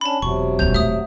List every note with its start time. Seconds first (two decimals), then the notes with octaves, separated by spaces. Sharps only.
0.01 C#4 D4 A5 B5
0.22 E1 C3 F#3 C#6
0.59 D#1 B3 G6 F7
0.74 A3 E5 D#6